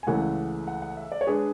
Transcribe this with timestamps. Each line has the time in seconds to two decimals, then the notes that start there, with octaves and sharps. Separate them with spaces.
0.03 G#5
0.07 C#2 C#3 E3 A3 F#5
0.67 F#5
0.82 F#5
0.97 E5
1.12 D5
1.21 C#5
1.26 G#3 D4 G#4 B4